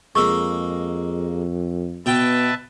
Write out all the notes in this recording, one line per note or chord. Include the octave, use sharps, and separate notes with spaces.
F2 G#3 A#3 C#6 E6
B2 B3 B4 E5 G5 A5